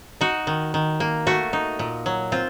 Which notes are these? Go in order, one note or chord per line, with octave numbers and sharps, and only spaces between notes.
D#4 F#4
D#3
D#3
A#3
A3 F#4
D#4
A#2
F#3
C4 F4